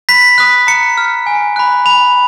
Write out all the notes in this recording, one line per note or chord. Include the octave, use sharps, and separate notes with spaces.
B5 B6
D#6 F#6
A#5 C#7
F6
G#5
B5 F#6
B5 F7